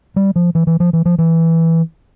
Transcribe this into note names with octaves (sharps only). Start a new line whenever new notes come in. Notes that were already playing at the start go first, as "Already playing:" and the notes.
G3
F3
E3
E3
F3
E3
F3
E3